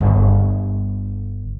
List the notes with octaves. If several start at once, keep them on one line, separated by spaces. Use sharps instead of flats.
G1